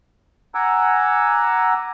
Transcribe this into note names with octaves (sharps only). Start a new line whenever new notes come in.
F#5 G#5 A#5 D6 E6